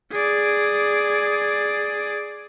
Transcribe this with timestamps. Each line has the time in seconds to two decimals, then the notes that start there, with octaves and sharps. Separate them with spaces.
0.11 G#4 D5